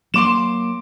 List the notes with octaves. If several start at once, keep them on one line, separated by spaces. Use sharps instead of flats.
F#3 A#3 C6 D6 E7